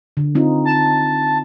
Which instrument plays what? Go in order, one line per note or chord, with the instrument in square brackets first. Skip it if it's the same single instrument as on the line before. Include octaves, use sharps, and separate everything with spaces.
[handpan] D3
C4 D#4 F4
[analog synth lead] A5